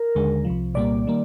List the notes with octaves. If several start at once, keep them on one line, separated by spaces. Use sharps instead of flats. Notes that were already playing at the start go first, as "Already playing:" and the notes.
Already playing: A#4
D#2 D3 G#3
C2 C3 F3
C2 A#2 G3 A#3 D5
D#3 G3 A#3